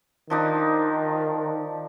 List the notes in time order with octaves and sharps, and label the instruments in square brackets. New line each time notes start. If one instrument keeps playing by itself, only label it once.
[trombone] D#3 [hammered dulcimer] F3 D4 D#4